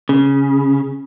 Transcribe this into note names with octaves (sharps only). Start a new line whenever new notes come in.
C#3